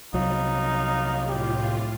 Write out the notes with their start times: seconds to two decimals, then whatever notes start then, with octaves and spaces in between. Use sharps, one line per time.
0.14 C2 F#3 D#4 F5
1.27 A2 F4 G4